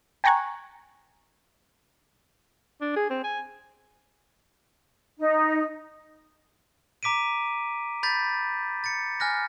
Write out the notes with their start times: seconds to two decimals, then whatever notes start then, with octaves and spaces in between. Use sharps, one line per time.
0.24 G5 G#5 A#5 C#6 F#6 G#6
2.81 D4
2.96 G#4
3.10 C4
3.24 G#5
5.18 D#4
7.03 A#5 D6 B6 D7 D#7
8.03 B5 G6 A6 B6
8.84 A6 C#7
9.20 G#5 F6 F#6 A#6